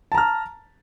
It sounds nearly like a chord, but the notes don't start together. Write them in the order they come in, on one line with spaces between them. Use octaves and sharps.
A5 A#5 F6